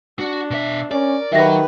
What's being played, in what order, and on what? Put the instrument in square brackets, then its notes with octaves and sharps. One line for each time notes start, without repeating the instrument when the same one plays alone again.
[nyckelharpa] D4 [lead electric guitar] F#4
[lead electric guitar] B2 E5
[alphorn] C#4 [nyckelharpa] A#4 [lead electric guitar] D5
[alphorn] D#3 [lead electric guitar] F#3 F#4 [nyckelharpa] G4 B4 [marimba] E5 A#6